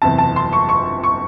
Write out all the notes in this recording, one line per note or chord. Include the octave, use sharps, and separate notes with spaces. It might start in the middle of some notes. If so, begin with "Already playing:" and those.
F#1 E2 C3 A5
A5
C6
C#6
C#6
C#6